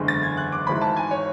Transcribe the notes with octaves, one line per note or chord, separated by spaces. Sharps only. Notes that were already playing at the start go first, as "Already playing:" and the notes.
Already playing: F#1 E2 D3 G#3
A6
G#6
F#6
D6
G#1 G#2 E3 G#3 B5
A5
G#5
C#5